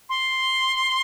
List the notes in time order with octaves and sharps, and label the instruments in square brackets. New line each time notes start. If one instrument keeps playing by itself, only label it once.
[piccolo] C6